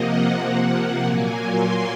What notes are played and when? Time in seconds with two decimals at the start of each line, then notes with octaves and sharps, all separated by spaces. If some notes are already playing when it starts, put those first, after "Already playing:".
Already playing: C3 F3 A#3 D#5 F#5
0.27 C3 F3 A#3
1.01 A#2 F#3 A#3 G#5
1.38 C6